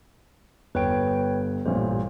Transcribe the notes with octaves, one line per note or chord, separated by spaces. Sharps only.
G1 B4 C#5 G5 D7
A1 G2 A#2 C5